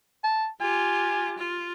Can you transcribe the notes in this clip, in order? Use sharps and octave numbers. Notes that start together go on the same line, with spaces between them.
A5
F4 G4 G#5
F4